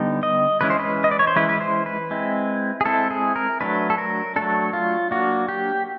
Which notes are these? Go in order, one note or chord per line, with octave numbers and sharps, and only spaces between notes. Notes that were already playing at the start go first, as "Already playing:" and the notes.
Already playing: D3 G3 B3 D#4
D#5
E3 G#3 C#4 E4 B4
C5
B4
D#5
D5
C#5
C5
E3 G#3 C#4 E4 B4
B4
C5
B4
G#3 C4 E4
G#4
G#3 C4 E4 A4
G#4
A#4
F#3 A3 D4 B4
A4
A#4
F#3 A3 D4 A4
F4
F#3 A#3 D4 F#4
G4